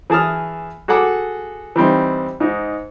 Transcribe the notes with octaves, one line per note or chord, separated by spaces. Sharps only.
E3 G#4 A5 D#6 F6
F#4 G#4 A4 F#5 D6
E3 G3 C4 D#4
G#2 D#4